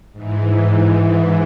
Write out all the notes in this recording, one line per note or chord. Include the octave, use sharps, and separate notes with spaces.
G#2 E3